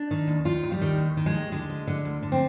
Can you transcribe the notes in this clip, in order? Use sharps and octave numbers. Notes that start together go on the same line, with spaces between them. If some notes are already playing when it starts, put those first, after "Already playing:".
Already playing: D4
D#3
D#2
D#3 F4
D#2
G3
D#3
D#2
D#3
G#3
D#2
D3 G#3
D2
D3
D2
D3
C4